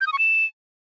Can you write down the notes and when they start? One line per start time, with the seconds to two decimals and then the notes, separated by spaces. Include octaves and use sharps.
0.01 G6
0.07 D#6
0.13 C#6
0.18 E7